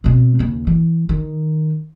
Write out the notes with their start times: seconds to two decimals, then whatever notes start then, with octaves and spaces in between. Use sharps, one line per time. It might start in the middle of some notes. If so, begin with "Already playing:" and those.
0.04 B2 C4
0.39 D#2 C#3
0.67 E3
1.09 D#3